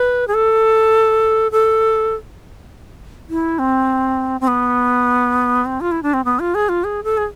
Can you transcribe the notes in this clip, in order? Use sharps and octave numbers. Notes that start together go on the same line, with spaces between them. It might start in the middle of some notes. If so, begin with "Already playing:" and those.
Already playing: B4
G#4
A4
A4
E4
C4
C4
B3
C4
F4
E4
D4
C4
B3
F4
G#4
F4
G#4
A4
G#4